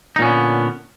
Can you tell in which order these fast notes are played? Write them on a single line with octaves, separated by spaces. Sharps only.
D#4 A#2 C#4 B3 D3